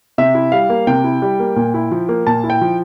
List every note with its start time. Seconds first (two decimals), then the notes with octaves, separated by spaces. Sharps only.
0.18 C3 E5
0.35 E4
0.52 G3 F5
0.70 A#3
0.87 C3 G5
1.04 E4
1.22 G3
1.40 A#3
1.56 A#2
1.74 E4
1.91 F3
2.09 A#3
2.27 A#2 A5
2.44 E4
2.50 G5
2.61 F3